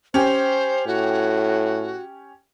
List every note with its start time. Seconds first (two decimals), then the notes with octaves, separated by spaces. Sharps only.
0.14 C#4 G4 C5
0.87 A2 F#4